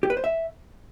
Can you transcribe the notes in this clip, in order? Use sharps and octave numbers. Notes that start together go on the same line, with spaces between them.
G4
B4
C5
E5